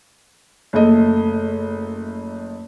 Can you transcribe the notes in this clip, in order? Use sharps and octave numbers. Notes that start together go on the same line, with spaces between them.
F#1 A3 D#5